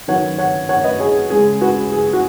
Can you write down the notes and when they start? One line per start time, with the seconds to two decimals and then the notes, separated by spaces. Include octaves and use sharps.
0.08 D#3 F#3 B3 C#5 F#5
0.38 C#5 F#5
0.69 C#5 F#5
0.84 B4 D#5
1.00 G#4 C#5
1.30 C#3 G#3 C#4 G#4
1.61 F#4 B4
1.92 G#4
2.13 F#4